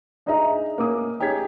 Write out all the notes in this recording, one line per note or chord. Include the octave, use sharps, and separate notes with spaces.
D4 D#4 G#4 D#5 E5 A#5
A#3 C#4 D6 D#6
D#4 G4 G#4 C#5 G#6 B6